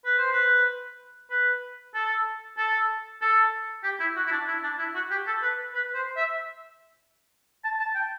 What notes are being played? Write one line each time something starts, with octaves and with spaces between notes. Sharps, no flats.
B4
C5
B4
B4
A4
A4
A4
G4
E4
F#4
E4
D4
E4
D4
E4
F#4
G4
A4
B4
B4
C5
E5
A5
A5
G5